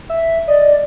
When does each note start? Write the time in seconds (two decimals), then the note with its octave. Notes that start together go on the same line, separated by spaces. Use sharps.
0.10 E5
0.48 D5 D#5